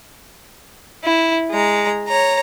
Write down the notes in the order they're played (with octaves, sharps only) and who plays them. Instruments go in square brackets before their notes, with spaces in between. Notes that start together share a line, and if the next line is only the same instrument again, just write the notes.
[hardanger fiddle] E4
G#3 A#5
C#5 A#5